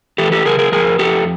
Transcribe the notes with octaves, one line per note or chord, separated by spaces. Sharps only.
E3 G4 A4
G4 A4
C#3 G#4 A#4
G#4 A#4
F2 G#4 A#4
F2 G4 A4